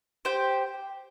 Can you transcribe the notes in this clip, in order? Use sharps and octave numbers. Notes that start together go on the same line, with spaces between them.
G4 C5 G5